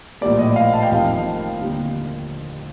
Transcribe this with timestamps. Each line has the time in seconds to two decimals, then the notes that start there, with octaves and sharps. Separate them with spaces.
0.21 A#1 A2 G3 A#3 D5
0.39 D#5
0.56 F5
0.73 A5
0.82 G5
0.91 F1 F2 D#3 G3 A#3 F5
1.61 D#2 D3 G3 A#3